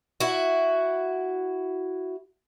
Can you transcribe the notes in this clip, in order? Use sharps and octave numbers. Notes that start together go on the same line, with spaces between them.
E4 F#4